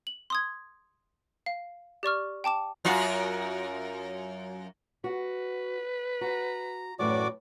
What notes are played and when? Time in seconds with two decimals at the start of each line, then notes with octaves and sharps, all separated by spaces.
0.07 F#7
0.30 C6 D#6 G#6
1.46 F5
2.03 G4 D5 C#6 F6
2.44 G5 A5 D6 E7
2.85 F#2 F4 F#4
5.04 F#4 B4
6.21 F#4 A#5
6.99 F#2 A2 E3 F#4 D5 D6